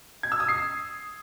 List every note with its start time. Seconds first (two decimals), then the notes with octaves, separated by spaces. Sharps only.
0.23 G#6
0.32 E6
0.40 D#6
0.48 C7